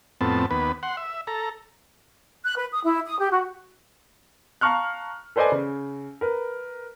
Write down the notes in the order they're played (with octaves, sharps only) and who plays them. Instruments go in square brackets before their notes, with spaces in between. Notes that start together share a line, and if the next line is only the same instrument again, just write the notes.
[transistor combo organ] F2 A2 B3 C4 A5
D#2 B3 B4
F#5 C6
E5
A4 A#5
[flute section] F#6
B4
D#6
E4
D#6
G4
F#4
[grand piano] F5 A5 A#5 C#6 F6 F#6
A4 B4 C5 D5 D#5 G#5
C#3
A#4 B4